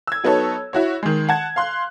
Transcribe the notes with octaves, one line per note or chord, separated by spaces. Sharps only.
E6 G#6
F#3 B3 D#4 A4 C#5
E4 F#4 C#5
D#3 G#3
F#5 A5 G#6
F5 C6 F#6